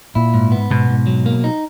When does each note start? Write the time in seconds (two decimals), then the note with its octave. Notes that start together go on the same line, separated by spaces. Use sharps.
0.15 A#2 E4
0.34 G#2
0.52 B3
0.70 G#2 B2
0.89 G#2
1.07 F#3
1.26 A#3
1.44 D#4